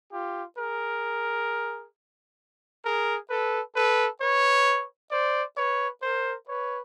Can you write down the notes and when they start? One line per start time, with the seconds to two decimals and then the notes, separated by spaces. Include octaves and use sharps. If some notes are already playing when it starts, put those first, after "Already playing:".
0.12 F4 G4
0.58 G#4 A#4
2.85 G#4 A#4
3.30 A4 B4
3.75 A4 B4
4.21 B4 C#5
5.11 C5 D5
5.57 B4 C#5
6.02 A#4 C5
6.48 B4 C#5